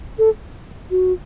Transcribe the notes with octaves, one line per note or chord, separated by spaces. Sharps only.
A4
F#4